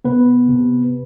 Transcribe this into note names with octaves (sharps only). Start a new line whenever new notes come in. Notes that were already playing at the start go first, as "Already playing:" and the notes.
C3 B3 B4
C3